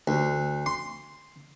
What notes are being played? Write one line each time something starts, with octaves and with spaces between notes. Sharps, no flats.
D2
C6